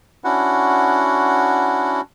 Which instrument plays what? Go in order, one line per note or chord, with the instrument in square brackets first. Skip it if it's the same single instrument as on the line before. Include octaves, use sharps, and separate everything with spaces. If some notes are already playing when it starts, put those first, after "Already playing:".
[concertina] C#4 D4 E4 F#4 F#5